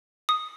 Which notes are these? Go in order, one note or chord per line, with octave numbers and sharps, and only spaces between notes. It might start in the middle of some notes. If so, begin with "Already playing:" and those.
D#6